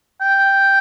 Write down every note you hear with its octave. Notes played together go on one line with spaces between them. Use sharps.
G5